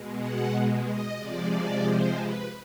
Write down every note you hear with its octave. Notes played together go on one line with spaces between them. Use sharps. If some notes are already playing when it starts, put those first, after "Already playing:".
Already playing: B2 G#3
F#5
D#5
C3 F3 G#3 D5
D5
C5
B4